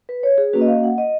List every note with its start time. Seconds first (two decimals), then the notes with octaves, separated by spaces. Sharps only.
0.09 B4
0.23 C#5
0.38 G#4
0.53 A#3 C#4 F#4 B4
0.61 D#5
0.68 F5
0.84 F#5
0.98 D#5